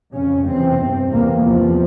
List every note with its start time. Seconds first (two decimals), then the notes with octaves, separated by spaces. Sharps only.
0.12 F2 C#3 C#4
0.45 E2 C3 C4
0.77 G2
1.10 E2 C3 A#3
1.42 E2 C3 F3